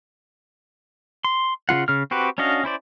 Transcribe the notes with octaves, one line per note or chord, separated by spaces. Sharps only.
C6
C#3 A3 F4 F#5
C#3 F6
C4 F#4 G4 B4
C#4 D4 F#4 D#5 F5
C#4 E4 C5 D5